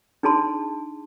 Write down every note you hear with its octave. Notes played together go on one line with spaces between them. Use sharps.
D4 D#4 G#4 A5 C6